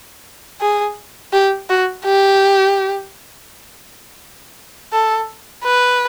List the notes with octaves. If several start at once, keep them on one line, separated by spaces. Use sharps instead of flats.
G#4
G4
F#4
G4
A4
B4